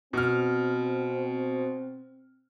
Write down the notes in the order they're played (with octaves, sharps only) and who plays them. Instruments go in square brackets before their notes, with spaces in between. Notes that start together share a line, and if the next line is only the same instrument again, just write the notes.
[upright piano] B2 F6 [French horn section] C4